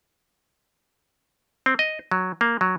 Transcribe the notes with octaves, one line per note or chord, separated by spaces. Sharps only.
C4
D#5
F#3
A#3
F#3